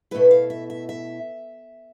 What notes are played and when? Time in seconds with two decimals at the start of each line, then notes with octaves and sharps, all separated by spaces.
0.11 B2 A3 E4 B4
0.31 F5
0.50 E5
0.70 E5
0.89 E5